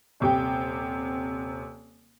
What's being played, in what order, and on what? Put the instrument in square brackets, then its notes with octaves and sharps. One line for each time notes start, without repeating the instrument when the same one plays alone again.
[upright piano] D#1 C3 G4 G5